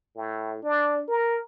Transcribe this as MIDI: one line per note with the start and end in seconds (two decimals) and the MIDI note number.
0.16 0.62 45
0.63 1.02 62
1.08 1.37 70